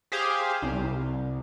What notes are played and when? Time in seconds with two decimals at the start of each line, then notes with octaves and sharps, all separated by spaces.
0.12 G4 G#4 C5 F5
0.62 C2